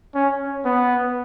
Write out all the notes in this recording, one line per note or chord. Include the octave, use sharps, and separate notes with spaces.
C#4
B3